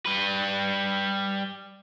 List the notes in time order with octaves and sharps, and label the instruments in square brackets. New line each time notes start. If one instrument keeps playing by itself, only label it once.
[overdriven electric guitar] G3 B4